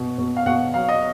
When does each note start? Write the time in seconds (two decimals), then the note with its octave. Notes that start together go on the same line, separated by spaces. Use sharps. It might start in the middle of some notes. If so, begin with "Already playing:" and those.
Already playing: B2
0.18 B2
0.37 F5
0.46 B2 F#5
0.74 F#3 F5
0.89 D#5